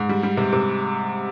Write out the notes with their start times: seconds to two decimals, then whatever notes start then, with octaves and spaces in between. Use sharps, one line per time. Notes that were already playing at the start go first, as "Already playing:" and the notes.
Already playing: G#2
0.09 G3
0.23 G3
0.37 C3
0.53 C3